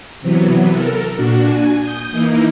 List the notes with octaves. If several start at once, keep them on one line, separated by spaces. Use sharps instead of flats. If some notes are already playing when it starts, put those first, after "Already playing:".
C3 E3 F#3 B3
A4 A#4
A#2 D4 F#4
G#5
D#6 G6
E3 A#3 D#4 E4